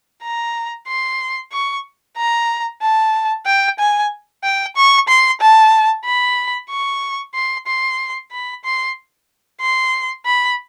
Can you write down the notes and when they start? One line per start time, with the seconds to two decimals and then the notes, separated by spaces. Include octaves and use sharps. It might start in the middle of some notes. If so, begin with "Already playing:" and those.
0.23 A#5
0.88 C6
1.52 C#6
2.17 A#5
2.82 A5
3.46 G5
3.79 G#5
4.44 G5
4.77 C#6
5.09 C6
5.41 A5
6.06 B5
6.70 C#6
7.35 C6
7.67 C6
8.32 B5
8.65 C6
9.61 C6
10.26 B5